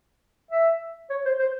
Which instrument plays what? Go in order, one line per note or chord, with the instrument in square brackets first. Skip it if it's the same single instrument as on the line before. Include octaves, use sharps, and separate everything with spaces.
[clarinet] E5
C#5
C5
C5